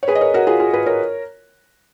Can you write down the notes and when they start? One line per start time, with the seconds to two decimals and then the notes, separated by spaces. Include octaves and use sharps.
0.03 C#5
0.08 G#4 B4
0.15 D#5
0.21 A#4 C#5
0.34 F#4 A#4
0.47 F4 G#4
0.60 F4 G#4
0.73 G#4 B4
0.86 A#4 C#5